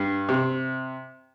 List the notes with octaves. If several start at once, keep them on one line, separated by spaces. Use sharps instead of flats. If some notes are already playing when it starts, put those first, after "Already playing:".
Already playing: G2
C3